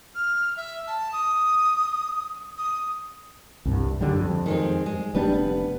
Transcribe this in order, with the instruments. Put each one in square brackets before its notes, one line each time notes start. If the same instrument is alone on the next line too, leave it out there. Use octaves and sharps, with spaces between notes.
[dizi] F6
E5
A5
D#6
D#6
[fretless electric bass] C2 G2
F#2 D3 G3
F2
[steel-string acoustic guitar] D#3 G#3 C4
G#3
[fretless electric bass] F1 G3 D4 [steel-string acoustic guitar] B3 B4